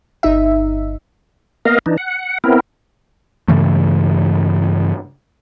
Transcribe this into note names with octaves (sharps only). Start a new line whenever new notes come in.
G1 D#4 E5
A#3 B3 A#4 D#5 F5
E3 D4 D#4
F#5
B3 C4 E4 A#4
G2 C#3 E3 A3